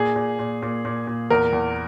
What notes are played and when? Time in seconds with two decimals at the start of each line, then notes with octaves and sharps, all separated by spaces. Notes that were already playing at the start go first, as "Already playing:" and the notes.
Already playing: A#2 G#4
0.16 A#2
0.39 A#2
0.62 A#2
0.85 A#2
1.07 A#2
1.30 E2 A#4
1.53 E2